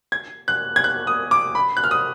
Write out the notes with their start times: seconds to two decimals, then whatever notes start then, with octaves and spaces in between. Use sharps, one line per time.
0.12 G#6
0.48 F#6
0.76 G#6
0.84 F#6
1.07 D#6
1.31 D6
1.55 B5
1.77 F#6
1.84 F6
1.91 D#6